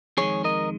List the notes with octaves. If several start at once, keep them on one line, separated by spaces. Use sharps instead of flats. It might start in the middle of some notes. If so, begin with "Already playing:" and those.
F2 D#3 G#3 G#4 C#5
A#4 D#5